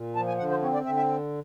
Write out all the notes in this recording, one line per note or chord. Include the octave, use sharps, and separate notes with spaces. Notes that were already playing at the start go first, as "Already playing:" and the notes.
Already playing: A#2
F3 A5
G#5
D3 F#5
C5
C4 C#5
D5
D3 E5
E5